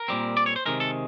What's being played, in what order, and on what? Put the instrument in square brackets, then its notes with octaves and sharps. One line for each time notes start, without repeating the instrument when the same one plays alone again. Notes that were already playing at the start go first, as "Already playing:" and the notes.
Already playing: [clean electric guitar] A#4
A#2 G3 C4
D5
C#5
C5
C3 D#3 G#3 A#4
A4